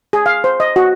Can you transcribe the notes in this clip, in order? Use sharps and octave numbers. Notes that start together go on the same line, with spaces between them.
G#4
F5
C5
D#5
F#4